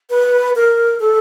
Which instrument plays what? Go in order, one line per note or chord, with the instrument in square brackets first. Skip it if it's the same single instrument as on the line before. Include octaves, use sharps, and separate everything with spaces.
[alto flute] B4
A#4
A4